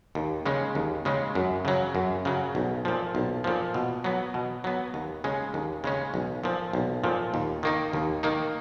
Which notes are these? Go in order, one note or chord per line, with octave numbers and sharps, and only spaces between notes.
D#2
C#3 G#3 C#4
D#2
C#3 G#3 C#4
F#2
C#3 F#3
F#2
C#3 F#3
B1
A#2 F3
B1
A#2 F3
B2
F#3 B3
B2
F#3 B3
D#2
C#3 G#3 C#4
D#2
C#3 G#3 C#4
B1
A#2 F3
B1
A#2 F3
D#2
D#3 A#3 D#4
D#2
D#3 A#3 D#4